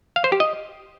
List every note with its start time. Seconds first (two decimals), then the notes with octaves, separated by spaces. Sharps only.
0.16 F5
0.24 C5
0.32 G4
0.40 D#5